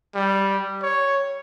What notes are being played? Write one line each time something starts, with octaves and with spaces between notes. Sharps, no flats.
G3
C#5